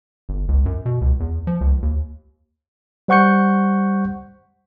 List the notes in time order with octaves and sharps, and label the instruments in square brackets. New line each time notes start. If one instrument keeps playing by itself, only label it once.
[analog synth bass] G1
C#2
F#2
B2
C#2
E2
F3
C#2
D#2
[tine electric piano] G3 C5 F#5 C#6 G6 C#7